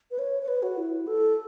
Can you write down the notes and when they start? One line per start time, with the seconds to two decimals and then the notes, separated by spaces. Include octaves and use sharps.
0.11 B4
0.19 C#5
0.42 C#5
0.48 B4
0.63 F#4
0.77 E4
1.07 A4